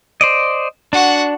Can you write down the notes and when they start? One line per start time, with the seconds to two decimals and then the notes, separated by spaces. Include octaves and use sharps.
0.21 C5 D5 D#5
0.93 D4 F#4 F#5